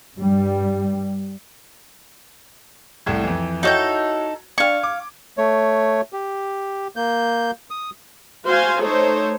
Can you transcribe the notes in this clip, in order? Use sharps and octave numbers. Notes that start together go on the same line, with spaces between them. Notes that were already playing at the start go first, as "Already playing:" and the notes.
G2 G3
C2 A2 G#6
F2 E3
D#4 E4 F#4 A4 C#5 G6
D4 F5 C#6 G#6
D6
A3 C#5
G4
A#3 G6
D#6
F#4 C5 F5 G#5 C6
A3 D#4 A4 C5 C#5